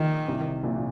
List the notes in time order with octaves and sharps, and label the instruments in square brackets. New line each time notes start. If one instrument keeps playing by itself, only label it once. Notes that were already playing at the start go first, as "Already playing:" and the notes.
Already playing: [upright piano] A#1 A#2 [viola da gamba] D#3
[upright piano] C2 C3
A#1 A#2
A#2